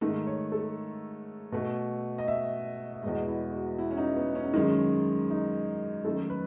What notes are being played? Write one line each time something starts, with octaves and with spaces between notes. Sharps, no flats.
G#2 D#3 A3
C#5
A4
B2 A3
D#5
E5
E5
E2 B2 G#3 D#5
E4
F#4
E4
C#4
D#4
B3
C#4
F#2 D#3 G#3
D#4
F#2 D#3 A3 A4
B4